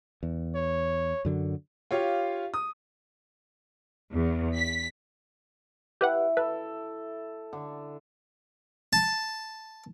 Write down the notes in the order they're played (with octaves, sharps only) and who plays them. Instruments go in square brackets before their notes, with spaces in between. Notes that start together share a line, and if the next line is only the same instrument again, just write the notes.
[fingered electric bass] E2
[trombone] C#5
[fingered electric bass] F#2 D3 F#3
[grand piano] F4 G4 C#5 F5
D#6
[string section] E2
B6
[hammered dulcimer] E4 [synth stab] G4 B4 F#5
[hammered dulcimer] A4 [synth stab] B4
[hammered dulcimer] D3
[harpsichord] A5